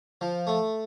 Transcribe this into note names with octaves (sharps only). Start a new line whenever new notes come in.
F3
A3